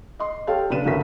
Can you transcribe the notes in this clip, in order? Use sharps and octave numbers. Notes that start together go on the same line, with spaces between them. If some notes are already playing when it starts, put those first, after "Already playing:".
D#5 C6
G4 A4 C#5 F5 G5 A5
F#1 D4 A4 B4 D#7 E7
A1 D2 G2 F#4 A#4 B6